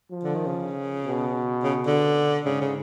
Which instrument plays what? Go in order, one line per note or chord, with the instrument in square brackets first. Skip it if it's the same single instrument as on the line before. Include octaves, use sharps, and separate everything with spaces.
[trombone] F3
[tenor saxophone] D3
D#3
C#3
[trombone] B2
[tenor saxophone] C#3
D3
[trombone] G#2 [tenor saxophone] C#3
[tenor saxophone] C#3